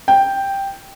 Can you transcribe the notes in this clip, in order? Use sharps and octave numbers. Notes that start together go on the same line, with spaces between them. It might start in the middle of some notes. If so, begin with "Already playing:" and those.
G5